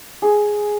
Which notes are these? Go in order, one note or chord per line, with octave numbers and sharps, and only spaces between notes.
G#4